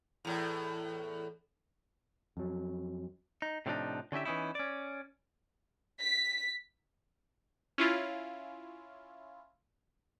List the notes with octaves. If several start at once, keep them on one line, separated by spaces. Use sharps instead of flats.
E2 A2
F2 F#3
D#4
A2 C3 F3 G#3 D4 D#4
D3 C#4 E4 G4 E5
E3 B3 C#4 D#4 E4
C#4 D5
B6
C#4 E4 F4